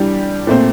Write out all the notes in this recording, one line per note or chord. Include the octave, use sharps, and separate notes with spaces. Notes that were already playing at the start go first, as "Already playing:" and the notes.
Already playing: E3 G3 D4 G4
A#2 A3 C4